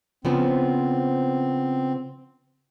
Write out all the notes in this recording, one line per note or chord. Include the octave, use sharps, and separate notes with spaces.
C#3 F3 B3 C4